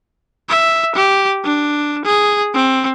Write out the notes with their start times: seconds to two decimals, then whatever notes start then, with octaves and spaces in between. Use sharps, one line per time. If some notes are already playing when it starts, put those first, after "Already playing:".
0.49 E5
0.95 G4
1.44 D4
2.05 G#4
2.54 C4